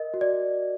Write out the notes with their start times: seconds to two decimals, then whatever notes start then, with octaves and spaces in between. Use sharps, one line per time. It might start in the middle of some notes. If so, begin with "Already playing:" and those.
Already playing: A#4 D#5
0.14 F#4
0.21 D5